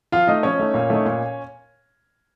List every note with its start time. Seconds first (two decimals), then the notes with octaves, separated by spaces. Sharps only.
0.12 F3 F4 F5
0.27 A3 D#4 D#5
0.43 F3 C#4 C#5
0.59 A3 D#4
0.74 A#2
0.90 A3 D#4
1.05 A#2